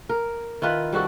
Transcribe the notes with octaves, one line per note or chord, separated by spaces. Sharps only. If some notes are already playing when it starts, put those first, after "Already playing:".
A#4
D#3 E4 F4 B4
G3 C4 F#4 A4